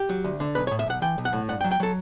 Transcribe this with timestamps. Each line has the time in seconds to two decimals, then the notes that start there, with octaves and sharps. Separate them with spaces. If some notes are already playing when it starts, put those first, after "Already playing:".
Already playing: G4
0.09 F#3
0.24 D2
0.40 D3
0.55 B1 B4
0.67 C#5
0.71 A2
0.79 E5
0.86 B1 F#5
1.02 E3 G5
1.18 B1
1.25 F#5
1.33 A2
1.48 G2 F#5
1.61 G5
1.64 F#3
1.71 G5
1.80 F#3 A4